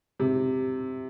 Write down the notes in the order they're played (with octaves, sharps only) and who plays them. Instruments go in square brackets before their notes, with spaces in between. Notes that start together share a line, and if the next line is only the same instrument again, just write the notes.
[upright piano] C3